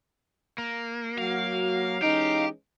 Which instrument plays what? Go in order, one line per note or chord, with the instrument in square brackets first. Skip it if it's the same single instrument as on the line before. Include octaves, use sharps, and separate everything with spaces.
[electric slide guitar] A#3
[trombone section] F#3 F#4 [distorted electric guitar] F5
[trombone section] E3 G#3 C#4 [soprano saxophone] D#4 [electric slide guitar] G4